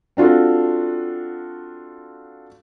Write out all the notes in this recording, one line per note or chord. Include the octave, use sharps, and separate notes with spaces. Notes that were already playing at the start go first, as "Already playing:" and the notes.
C4 D4 F4 F#4 A4